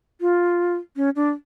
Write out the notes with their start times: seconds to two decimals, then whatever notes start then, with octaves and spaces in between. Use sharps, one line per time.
0.21 F4
0.96 C#4
1.16 D4